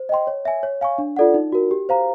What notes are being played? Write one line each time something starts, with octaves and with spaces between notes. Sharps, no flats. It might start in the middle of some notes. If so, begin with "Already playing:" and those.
Already playing: C5
D#5 G5 C6
C#5
E5 G#5
C#5
F5 G#5 C#6
D4
F4 A4 D5 F#5
D#4
F#4 A#4
G4
C5 F5 A#5